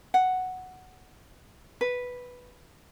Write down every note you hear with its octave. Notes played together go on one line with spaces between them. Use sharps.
F#5
B4